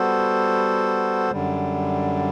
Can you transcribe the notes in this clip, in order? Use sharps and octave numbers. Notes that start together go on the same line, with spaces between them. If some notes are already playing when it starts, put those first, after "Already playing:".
Already playing: G3 B3 F#4 A4 C5
F#2 D3 G3